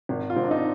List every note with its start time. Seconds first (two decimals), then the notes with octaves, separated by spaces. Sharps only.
0.09 G#1
0.30 F4
0.36 G#1 C4
0.44 D4
0.51 D#4